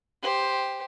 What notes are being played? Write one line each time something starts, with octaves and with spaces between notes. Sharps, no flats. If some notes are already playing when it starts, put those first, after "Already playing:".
G4 C5